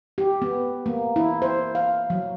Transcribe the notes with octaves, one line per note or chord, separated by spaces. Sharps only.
G4
B3
A#3
E4
C5
F5
F#3